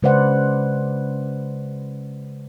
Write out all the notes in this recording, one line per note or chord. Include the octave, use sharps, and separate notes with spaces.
C#3 G#3 B4 C5 D5 F#5